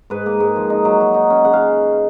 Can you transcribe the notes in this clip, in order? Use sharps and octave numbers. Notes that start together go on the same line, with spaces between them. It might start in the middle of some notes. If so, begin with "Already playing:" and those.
G#2 B4
A#3
G#2
F3
D#4
F#3
F#3
D#4
C#4
C#3 F#5
F5